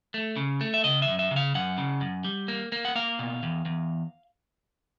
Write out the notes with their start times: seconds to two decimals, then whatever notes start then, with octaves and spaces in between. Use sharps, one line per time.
0.14 A3
0.36 C#3
0.61 A3
0.74 E5
0.84 C#3 D#5
1.02 E5
1.07 F#2
1.19 E5
1.31 C#3
1.36 F5
1.55 F#2 F#5
1.78 C#3
2.01 F#2
2.25 G3
2.48 A#3
2.72 A#3
2.85 F#5
2.96 A#3 F5
3.19 B2
3.43 E2
3.65 E2